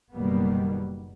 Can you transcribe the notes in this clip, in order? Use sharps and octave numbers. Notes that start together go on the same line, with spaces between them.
F#1 B2 D#3 G3 A#3 B3